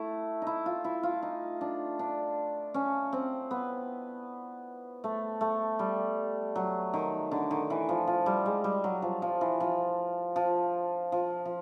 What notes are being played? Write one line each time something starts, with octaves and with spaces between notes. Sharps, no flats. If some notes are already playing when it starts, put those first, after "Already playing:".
Already playing: A3 E4
D#4 E4
F4
E4
F4
D#4
D4
D4
C#4
C4
B3
A3
A3
G3
F#3
D#3
D3
D#3
E3
F3
F3
G3
G#3
G3
F#3
F3
F3
E3
F3
F3
F3
F3